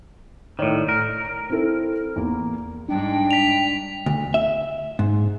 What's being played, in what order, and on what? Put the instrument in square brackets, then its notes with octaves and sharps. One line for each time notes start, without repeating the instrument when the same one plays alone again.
[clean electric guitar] A2 D#3 [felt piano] C#5 D5
[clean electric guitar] A#4
[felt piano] C4 E4 A4
E2 A#3
[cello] G#2 G3 [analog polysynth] D4 [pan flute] G5
[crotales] B6 F7
[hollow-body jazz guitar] D2
E5
G#2